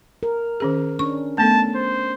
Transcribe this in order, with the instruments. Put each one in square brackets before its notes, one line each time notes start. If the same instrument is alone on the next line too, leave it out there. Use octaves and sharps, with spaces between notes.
[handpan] A#4
[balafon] D#3 C#4 G#4
[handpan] C#4 D4 [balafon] C#6
[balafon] A3 B3 A4 [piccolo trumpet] A5
[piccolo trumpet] C5